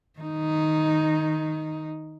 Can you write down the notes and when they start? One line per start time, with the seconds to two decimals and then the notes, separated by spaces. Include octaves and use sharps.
0.19 D#3 D#4